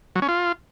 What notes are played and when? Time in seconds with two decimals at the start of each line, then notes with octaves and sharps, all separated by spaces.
0.16 F#3
0.22 C#4
0.29 F4